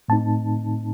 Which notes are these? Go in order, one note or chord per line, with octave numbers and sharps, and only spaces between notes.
A2 A3 C4 D#4 A5